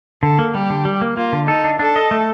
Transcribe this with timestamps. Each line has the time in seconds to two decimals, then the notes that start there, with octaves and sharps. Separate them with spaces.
0.23 D3 A4
0.39 A#3
0.54 G3 G4
0.70 D3
0.85 G3
1.02 A#3
1.17 A#3 F4
1.33 D3
1.48 D#4 A4
1.64 D4
1.79 D4 A4
1.96 D#5
2.11 A3